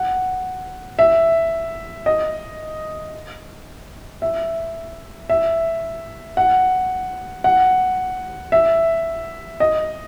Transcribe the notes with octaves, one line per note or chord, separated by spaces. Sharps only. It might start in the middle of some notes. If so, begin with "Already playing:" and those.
Already playing: F#5
E5
D#5
E5
E5
F#5
F#5
E5
D#5